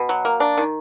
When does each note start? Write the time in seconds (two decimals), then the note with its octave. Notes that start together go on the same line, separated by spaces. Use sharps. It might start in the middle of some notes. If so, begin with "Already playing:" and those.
Already playing: B2
0.09 F#3
0.25 A#3
0.40 D4
0.57 D#3